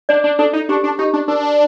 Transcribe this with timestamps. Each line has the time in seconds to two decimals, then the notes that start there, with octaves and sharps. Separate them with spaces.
0.09 D4 D5
0.24 D4
0.39 D4 A4
0.53 D#4
0.69 D4 G4
0.84 D4
0.99 D#4 G4
1.13 D4
1.28 D4 A#4